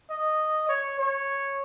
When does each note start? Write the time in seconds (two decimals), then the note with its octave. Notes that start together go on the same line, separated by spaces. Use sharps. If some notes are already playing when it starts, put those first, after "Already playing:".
0.10 D#5
0.69 C#5
0.99 C#5